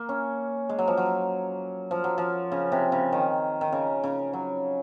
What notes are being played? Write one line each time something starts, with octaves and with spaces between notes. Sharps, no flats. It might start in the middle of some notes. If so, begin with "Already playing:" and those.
Already playing: A#3
C#4
G#3
F#3
F3
F#3
F3
F#3
F3
C#3
C3
C#3
D#3
D#3
C#3
C#3
F#3